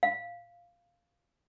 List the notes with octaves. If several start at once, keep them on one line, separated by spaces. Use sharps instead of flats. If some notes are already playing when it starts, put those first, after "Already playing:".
F5